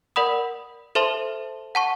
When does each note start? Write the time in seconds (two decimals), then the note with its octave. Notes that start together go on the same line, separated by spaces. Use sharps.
0.16 A#4 D5 F#5 B5 D#6
0.95 A4 C5 E5 A5 C6
1.75 F#5 A5 C#6